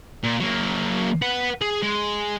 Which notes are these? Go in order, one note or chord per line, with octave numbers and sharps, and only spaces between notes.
A#2
F#3 A#3
B4 F#5
G#4
G#3